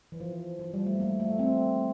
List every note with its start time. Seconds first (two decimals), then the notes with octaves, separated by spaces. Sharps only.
0.12 E3
0.20 F3
0.59 F3
0.74 G3
0.86 A3
1.00 A#3
1.20 A3
1.39 C4